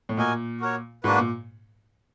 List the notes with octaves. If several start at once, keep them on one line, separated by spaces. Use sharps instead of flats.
A2
A#2 F#4 A#4 D#5 G#5
F#4 A#4 C#5
G#2 A#3 D4 F#4 B4
A#2